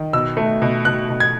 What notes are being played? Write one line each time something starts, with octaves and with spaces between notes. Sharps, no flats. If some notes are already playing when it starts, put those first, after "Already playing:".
Already playing: D#3
B2 E6
A3
B2
B2 F#6
B2
G#6